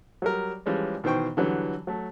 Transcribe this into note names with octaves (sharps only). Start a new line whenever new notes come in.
F#3 G3 A#4
E3 F3 G3 G#3 C#4
B2 D#3 E3 C5 G5 C#6
D3 E3 F#3 G3
F#3 A3